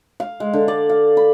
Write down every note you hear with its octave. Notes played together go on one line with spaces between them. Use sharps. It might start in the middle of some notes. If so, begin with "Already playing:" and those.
F5
G#3
D3
D5
F5
B5